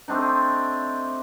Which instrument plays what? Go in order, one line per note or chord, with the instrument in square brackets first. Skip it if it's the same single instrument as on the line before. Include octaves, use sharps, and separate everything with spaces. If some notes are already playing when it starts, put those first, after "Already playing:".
[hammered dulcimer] A3 C4 D4 D#4